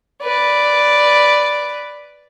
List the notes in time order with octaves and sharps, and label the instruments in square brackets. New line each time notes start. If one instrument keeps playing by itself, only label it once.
[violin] B4 D5